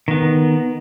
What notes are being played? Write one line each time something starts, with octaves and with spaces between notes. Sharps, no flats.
D#3 B3